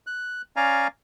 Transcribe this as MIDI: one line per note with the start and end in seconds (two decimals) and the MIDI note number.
0.07 0.42 90
0.56 0.88 61
0.56 0.88 74
0.56 0.88 77
0.56 0.88 80
0.56 0.88 82